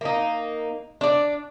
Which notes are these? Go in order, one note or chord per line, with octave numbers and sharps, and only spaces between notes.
A#3 D#4
D4 D5